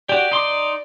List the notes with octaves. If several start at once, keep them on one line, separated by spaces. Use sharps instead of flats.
F#4 G4 D5
D#4 C6 D6